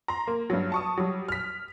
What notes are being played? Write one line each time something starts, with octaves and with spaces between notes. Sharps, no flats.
A#5 C6
A#3
G2 F#3
A5 C#6 D#6
F#3 G3
F6 B6